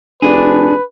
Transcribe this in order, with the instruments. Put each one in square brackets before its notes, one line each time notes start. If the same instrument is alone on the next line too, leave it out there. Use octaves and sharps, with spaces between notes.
[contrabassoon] F1 [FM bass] D4 [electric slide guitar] G#4 [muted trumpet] B4